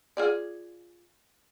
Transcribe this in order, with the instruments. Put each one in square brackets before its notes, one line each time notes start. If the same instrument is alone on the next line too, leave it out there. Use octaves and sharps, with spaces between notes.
[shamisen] F4 G#4 D5